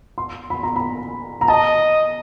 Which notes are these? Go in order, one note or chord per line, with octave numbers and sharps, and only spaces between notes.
C6
B5
A#5
B5
A#5
D#5 A5